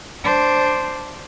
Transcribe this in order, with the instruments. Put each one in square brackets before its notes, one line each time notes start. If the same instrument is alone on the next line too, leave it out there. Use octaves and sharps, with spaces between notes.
[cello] D4 C5